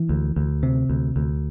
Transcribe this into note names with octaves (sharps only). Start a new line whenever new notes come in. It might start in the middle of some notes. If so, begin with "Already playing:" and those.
Already playing: E3
D2
D2
C3
D2
D2